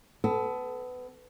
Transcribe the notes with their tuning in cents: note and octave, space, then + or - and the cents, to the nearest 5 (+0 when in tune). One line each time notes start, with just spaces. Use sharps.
B3 +25 A4 -10